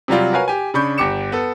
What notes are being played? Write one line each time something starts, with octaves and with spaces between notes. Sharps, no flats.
C3 F#3 G3 F4
F#4 A#4 B4 C#5 F5 G#5
G4 G#5
C#3 D4 B5 C#6 G6
G1 G4 D6 C#7 E7
B3 A4